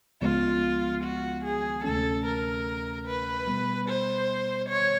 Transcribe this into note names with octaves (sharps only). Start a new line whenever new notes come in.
C#2 C#3 F3 G#3 B3 F4
F#4
G#4
D2 C3 E3 A3 C#4 A4
A#4
B4
B2 G3 B3
C5
C#5